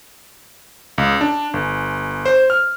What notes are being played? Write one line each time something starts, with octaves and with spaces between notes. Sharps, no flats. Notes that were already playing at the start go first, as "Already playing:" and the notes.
C#2
D4
G1
C5
F6